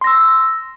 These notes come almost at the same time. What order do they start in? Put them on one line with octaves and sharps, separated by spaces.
C6 A#6 E6